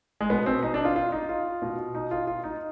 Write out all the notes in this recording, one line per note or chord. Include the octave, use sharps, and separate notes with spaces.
G#3
B2 B3
C4
D#4
D4
F4
F4
D#4
F4
B2
D#4
F4
F4
D#4